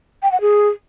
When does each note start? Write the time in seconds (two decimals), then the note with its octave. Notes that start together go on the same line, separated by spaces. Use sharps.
0.23 G5
0.32 F#5
0.41 G#4